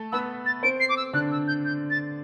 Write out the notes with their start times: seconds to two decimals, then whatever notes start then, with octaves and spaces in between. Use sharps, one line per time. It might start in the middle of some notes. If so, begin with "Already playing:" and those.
Already playing: A3 A4
0.12 B3 B4 E6
0.46 A6
0.63 C4 C5 D7
0.80 C7
0.89 D6
0.97 E6
1.13 D3 D4 F#6
1.31 E6
1.47 G6
1.65 G6
1.90 A6